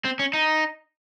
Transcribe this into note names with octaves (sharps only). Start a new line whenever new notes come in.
C4
C#4
D#4